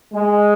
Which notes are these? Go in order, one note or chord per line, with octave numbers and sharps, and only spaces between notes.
G#3